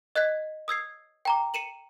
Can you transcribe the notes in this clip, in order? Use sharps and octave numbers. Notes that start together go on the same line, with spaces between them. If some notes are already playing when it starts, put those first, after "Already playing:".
D#5 F#6 G#6 B6
D#6 E6 G#6 C7
G5 A#5 D6
C#7 D#7 E7 F#7